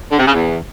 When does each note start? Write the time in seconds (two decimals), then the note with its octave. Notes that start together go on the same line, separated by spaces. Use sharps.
0.11 D3
0.19 C3
0.26 C#3
0.34 E2